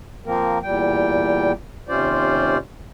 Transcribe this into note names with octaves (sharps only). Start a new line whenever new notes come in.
F3 A#3 C4 A#4
E2 A#2 G3 G5
D#2 C3 C#4 F4 C5 D5